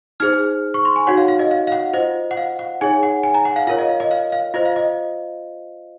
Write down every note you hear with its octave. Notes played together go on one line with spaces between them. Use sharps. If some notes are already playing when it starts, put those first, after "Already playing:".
D#4 G#4 C5 F6
C#6
C6
G#5
D#4 F#4 C#5 F#5
F5
F5
D#5
F5
F5
F#5
F4 C5 D#5
F#5
F5
F#5
D#4 G#4 C#5 G#5
F#5
G#5
A#5
F#5
F5
F4 A#4 C#5 F5
D#5
F5
D#5
F5
F5
F4 C5 D#5
F5
D#5